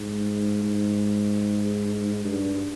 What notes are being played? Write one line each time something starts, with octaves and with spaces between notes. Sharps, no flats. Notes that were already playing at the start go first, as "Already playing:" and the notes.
Already playing: G#2
G#2
G2